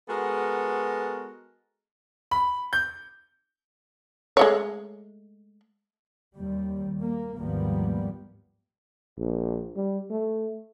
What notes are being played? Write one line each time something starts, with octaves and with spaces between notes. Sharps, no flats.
G#3 B3 F#4 A4 A#4
B5
G6
G#3 A3 C#5
D#2 G3
A#3
G#1 D#2 F3 G3 A#3 B3
A#1
G3
A3